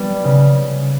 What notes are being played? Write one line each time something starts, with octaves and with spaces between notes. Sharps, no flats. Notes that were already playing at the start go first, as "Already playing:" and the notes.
Already playing: G3 B3
C#3